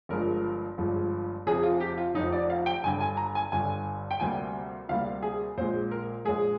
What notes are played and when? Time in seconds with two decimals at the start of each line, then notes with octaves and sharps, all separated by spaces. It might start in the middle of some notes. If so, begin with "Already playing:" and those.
0.09 G1 G2 F3 G#3 A#4
0.78 G1 G2 F3 G#3
1.47 F1 F2 C3 F3 G#4
1.63 F4
1.80 G4
1.98 F4
2.15 F1 F2 C3 F3 D#4
2.32 D5
2.50 F5
2.66 G5
2.83 G1 G2 D3 G#5
3.00 G#5
3.17 A#5
3.35 G#5
3.52 G1 G2 D3 G#5
4.11 G5
4.20 D2 C3 G3 A#3 G#5
4.89 D2 C3 G3 A#3 F5
5.22 G#4
5.58 A#1 A#2 G#3 C5
5.91 A#4
6.25 A#1 A#2 G#3 G#4